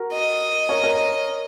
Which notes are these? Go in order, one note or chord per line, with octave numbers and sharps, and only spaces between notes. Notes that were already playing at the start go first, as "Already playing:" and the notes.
Already playing: F#4 A#4
D#5
A#4 C#5
A#4 C#5